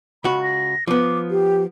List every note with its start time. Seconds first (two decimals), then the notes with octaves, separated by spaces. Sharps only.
0.24 C#2 F#4 B5
0.43 A#6
0.87 F3 B3 D6
1.31 G4